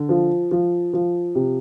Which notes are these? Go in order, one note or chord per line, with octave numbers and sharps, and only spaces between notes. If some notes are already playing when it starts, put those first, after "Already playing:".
Already playing: D3
F3
F3
F3
C3